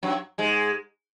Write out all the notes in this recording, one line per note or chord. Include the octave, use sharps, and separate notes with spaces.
F#2 F#3
G#2 G#3